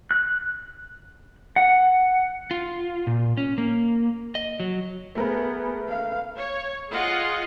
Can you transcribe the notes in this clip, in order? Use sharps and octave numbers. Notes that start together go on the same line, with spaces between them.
F#6
F#5
F4
A#2
C#4
A#3
D#5
F#3
A3 B3 G#4 A#4 B4
F5
C#5
F4 G#4 D#5 F#5 C6